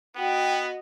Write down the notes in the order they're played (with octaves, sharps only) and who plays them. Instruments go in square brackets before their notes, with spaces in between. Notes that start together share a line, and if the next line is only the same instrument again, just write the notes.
[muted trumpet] B3 [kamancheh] F#4 D#5 [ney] G5